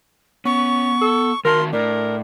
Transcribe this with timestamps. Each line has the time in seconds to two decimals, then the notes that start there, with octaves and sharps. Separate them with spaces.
0.45 B3 C#4 C#6
1.01 A4
1.45 D#3 F#4 A#4 A5 C6
1.73 A2 D4 A#4